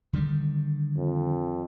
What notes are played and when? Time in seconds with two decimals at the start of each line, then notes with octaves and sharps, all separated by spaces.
0.13 D3 D#3 G3
0.97 F2